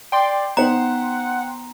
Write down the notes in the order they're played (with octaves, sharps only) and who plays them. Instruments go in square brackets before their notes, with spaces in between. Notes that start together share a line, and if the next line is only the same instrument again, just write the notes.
[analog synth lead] D5 [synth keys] G5 C6
[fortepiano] B3 D#4 C5 [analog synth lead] F#5 [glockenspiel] A#5